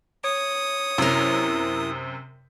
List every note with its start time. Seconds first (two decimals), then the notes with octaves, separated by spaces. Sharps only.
0.24 C#5 D#6
0.98 F#2 C3 E4 A#4